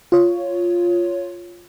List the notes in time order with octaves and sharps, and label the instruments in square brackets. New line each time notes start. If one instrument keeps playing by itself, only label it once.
[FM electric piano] F4 C#5